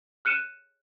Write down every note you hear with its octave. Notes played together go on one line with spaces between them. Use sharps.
F6 F#6 C#7 D#7 E7